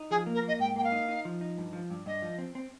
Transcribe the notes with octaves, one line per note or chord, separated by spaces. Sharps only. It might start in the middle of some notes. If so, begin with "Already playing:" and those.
Already playing: D#4
F3 G#4
A#3
A#4
A#3 D#5
G#2 G5
A#3 G5
F5
D#4
D#4
F3
D#4
G2
F3
G2
G2 D#5
F3
C4
C4